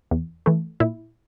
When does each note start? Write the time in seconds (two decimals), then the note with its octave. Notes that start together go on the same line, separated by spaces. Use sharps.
0.11 E2
0.46 E3 A3
0.80 A#2 E4